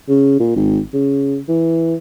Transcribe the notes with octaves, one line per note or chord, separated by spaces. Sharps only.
C#3
A#2
G#1
C#3
E3